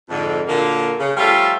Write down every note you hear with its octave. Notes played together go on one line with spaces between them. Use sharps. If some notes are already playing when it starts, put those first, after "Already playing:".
F2 G#2 D3
A#2 D3 F#3 A#3
C#3
F3 G3 A3 C#4 F4 E5